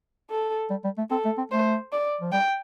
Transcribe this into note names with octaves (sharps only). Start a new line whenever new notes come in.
A4
G3
G3
A3
C4 A4
A3
C4
A3 C5
D5
F3
G3 G5